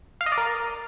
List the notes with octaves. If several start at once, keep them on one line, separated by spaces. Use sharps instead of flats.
F5
D#5
D5
A#4